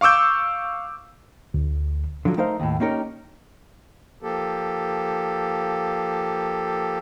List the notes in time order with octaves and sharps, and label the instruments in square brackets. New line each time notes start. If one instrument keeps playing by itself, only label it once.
[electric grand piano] F5 C#6 D6 E6 G6
[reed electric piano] D2
[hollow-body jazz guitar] D3 F3 F#3
A3 D#4 A#4 C5 F5
D#2 A2
A#3 C#4 D#4 G4 A#4 C#5
[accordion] F3 A#3 G4 A4